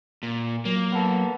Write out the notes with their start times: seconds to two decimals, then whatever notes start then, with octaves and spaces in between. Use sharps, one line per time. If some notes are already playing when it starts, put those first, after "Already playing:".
0.23 A#2
0.65 F#3 A#3
0.92 B3 A4